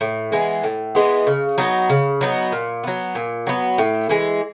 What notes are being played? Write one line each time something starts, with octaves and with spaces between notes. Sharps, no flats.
A2
E3 G#3 B3
A2
E3 G#3 B3
C#3
F#3 B3 D#4
C#3
F#3 B3 D#4
A#2
F#3 B3
A#2
F#3 B3
A2
E3 G#3